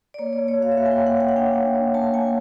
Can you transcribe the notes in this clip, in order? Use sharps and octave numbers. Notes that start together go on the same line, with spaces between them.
D5
A#3 C#5
D5
A#3
C#5
F#4 F5
E5
A#3 F5
G#5
G5
A#3
F#5
A#3 F#5
F#5
D4 G5
A#3
A#3
A#3 A5
A#3 G#5